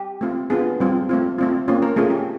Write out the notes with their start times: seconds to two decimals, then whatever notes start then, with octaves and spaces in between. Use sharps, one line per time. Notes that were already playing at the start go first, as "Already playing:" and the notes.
Already playing: G4
0.21 A3 C4 F4
0.50 B3 D4 F4 G#4
0.80 G3 C4 F4
1.09 A3 C4 F4
1.38 A3 C4 F4
1.68 A#3 C#4 F4
1.82 A#4
1.96 A3 C#4 F4 G#4
2.10 G4